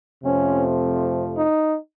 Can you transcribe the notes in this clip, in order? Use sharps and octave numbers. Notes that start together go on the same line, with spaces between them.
F2 C3 F3 A3 C#4
D#4